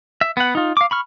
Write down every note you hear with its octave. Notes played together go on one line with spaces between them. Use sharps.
E5
B3 F#5
D#4 F4
F5 D6
B5 C#6 F6